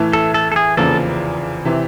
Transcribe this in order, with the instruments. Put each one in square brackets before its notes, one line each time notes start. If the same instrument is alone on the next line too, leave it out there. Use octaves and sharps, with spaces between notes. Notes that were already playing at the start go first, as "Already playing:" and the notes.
Already playing: [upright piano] A2 E3 A3
[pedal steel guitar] A4
A4
A4
G#4
[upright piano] F1 E2 C#3 F3 A#3 [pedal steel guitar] A4
[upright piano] C3 E3